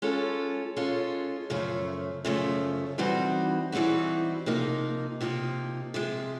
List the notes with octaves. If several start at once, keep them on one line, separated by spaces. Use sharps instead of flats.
G#3 C#4 F4 A4
G#3 C#4 F4 A4
F#2 C#3 F3 A3
F#2 C#3 F3 A3
E3 G3 C4 D#4 F#4
E3 G3 C4 D#4 F#4
C3 F3 A#3 D#4
C3 F3 A#3 D#4
C3 F3 G#3